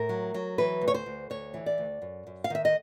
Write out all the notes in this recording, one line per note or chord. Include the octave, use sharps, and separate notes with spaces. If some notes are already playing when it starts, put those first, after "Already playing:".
Already playing: A2 A#4
F#3
F#3
E3 B4
D2
C#5
C5
D2
D2 C#5
E3
D5
D2
F#2
F#2
F5
D#3 E5
D#5